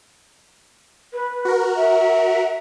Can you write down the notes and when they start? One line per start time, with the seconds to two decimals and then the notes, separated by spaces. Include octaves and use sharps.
1.14 B4
1.45 F#4 A#4
1.76 E5